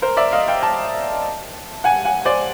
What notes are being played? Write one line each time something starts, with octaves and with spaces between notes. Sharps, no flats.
A#4 C5
D5 E5
D#5 F5
F5 G5
G5 A5
F#5 G#5
F#5 G#5
C5 D5